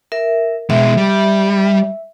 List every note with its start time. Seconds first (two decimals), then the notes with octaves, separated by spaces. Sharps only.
0.12 A#4 E5
0.70 B2 G#3 E5
0.97 G3